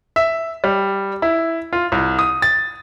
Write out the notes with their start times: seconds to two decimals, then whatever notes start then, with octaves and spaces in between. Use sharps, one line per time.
0.16 E5
0.64 G3
1.22 E4
1.73 F4
1.92 C2
2.19 D#6
2.42 A6